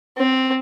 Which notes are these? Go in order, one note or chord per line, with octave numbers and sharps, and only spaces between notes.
C4